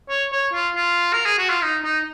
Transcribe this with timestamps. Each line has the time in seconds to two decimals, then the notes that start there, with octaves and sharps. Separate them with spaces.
0.09 C#5
0.32 C#5
0.53 F4
0.76 F4
1.13 A#4
1.26 G#4
1.38 F#4
1.50 F4
1.62 D#4
1.84 D#4